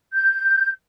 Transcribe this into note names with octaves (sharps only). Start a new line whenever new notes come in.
G6